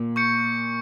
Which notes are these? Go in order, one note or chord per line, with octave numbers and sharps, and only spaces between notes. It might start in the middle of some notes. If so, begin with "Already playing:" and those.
Already playing: A#2
C#6 G6 C#7